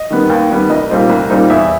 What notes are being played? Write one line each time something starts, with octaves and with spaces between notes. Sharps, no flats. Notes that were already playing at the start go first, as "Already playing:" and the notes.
Already playing: D#5
D#3 G3 B3
D#2
D#3 G3 B3
C2 D#5
A#2 G3 C4 D#4
C2
A#2 G3 C4 D#4
E2 E5